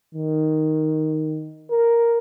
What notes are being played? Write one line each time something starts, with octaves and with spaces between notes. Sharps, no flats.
D#3
A#4